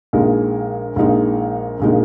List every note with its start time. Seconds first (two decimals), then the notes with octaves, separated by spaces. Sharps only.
0.13 A#1 A#2 G#3 D#4
0.96 A#1 A#2 G#3 D#4
1.80 A#1 A#2 G#3 D#4